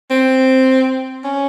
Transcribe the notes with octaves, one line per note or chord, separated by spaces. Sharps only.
C4
C#4